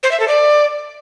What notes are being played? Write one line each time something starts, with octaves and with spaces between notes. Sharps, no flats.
C5
E5
A4
D5